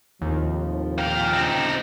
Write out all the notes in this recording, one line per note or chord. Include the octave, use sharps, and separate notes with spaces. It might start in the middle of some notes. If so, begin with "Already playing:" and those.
D#2 A2 C3 F3
A#2 F5 G5
D2 A#2 C#3 C4 D#4